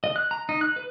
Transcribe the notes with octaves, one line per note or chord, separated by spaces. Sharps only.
D#5
F#6
A#5
D#4
F#6
B4